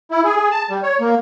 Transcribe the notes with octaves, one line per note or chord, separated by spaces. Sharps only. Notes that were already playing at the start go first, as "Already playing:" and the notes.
E4
G#4
G#4
A5
G3
C#5
A#3